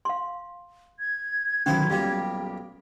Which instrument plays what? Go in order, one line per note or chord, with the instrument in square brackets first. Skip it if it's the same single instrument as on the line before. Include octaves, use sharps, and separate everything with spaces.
[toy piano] F5 C6
[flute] G#6
[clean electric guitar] D2 D#3 F#3 [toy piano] C#4 [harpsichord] E4 C5 F5
[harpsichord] B1 A#2 G3 [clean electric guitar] G4